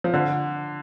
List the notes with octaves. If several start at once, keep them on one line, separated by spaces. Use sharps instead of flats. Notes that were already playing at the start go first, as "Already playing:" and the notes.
F3
D3